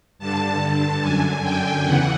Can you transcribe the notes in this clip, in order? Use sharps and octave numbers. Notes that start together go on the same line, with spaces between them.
G2 D3 A5
A5
F#2 D3 G#5
G5
E2 C#3 E3 F#5